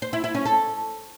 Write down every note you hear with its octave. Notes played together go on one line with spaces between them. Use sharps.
C5
E4
E4
C#4
A4